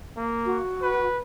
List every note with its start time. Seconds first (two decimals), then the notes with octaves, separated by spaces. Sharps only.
0.17 A#3
0.46 F#4
0.82 B4